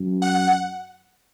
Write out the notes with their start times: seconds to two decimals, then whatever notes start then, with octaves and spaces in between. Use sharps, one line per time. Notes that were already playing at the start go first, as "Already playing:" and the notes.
Already playing: F#2
0.22 F#5